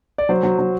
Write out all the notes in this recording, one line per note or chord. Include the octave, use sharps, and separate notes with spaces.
D5
F#3 C5
F#3
F#3